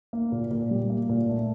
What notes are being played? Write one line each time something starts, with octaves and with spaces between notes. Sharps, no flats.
A#3
A#2
A#2
G3
A#3
A#2
A3